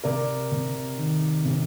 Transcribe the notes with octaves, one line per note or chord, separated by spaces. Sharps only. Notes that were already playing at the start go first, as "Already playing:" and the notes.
C3 A#4 D5
C3
D#3
C3